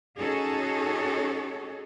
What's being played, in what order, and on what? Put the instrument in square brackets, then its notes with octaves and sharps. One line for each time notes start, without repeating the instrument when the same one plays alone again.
[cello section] C#4 D#4 F#4 G#4 A4 C#5